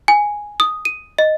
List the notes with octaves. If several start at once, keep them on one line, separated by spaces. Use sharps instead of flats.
G#5
D#6
D#7
D#5